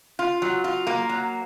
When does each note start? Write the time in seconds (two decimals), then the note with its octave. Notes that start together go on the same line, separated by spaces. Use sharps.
0.19 F4
0.42 F#3
0.64 F4
0.87 A#3
1.09 F#3